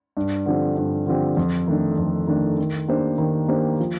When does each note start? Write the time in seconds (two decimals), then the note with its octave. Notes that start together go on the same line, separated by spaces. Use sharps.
0.17 G2
0.46 D3 F3 C4 G4
0.77 G2
1.07 D3 F3 C4 G4
1.37 F2
1.67 D#3 A3 D4
1.98 F2
2.27 D#3 A3 D4
2.58 D#3
2.88 A#3 D4 G4 C5
3.18 D#3
3.48 A#3 D4 G4 C5
3.80 F3